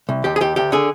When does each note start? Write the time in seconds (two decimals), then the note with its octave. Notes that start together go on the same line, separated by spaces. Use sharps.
0.09 C2
0.24 D#2 G4
0.36 G#4
0.41 D#2 G4
0.56 D2 G4
0.72 D3 G#4